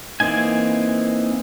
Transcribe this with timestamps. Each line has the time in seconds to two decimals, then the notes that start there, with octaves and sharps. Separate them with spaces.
0.20 E3 A#3 C4 D#4 G#5